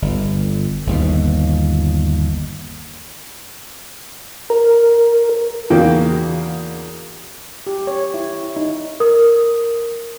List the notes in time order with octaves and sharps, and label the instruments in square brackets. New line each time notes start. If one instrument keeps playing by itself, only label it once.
[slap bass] G1
G1 D#2 B2
[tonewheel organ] A#4
[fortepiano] E2 C#3 A#3 D#4 F#4 G5
[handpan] G4
C#5
E4
D#4
[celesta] A#4 D#6